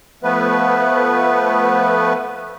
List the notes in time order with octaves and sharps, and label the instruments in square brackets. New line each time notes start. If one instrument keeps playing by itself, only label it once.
[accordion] F3 A3 B3 B4